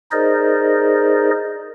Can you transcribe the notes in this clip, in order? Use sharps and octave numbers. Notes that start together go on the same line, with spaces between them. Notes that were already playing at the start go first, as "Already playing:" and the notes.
D#4 G#4 A#4 C5 D5 D#5